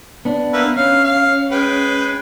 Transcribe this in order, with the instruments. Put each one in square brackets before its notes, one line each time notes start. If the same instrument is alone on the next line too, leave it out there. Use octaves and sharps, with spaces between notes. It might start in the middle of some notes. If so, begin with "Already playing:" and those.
[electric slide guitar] B3 D4
[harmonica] A#3 B4 E5
[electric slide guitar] C#4 [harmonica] F5
[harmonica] F5
G#3 B4 G5